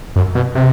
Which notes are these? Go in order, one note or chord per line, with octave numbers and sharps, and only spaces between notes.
F#2
B2
C3